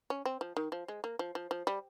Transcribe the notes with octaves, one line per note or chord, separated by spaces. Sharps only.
C#4
C4
F3
D#3
F3
G#3
A#3
F3
F3
F3
G3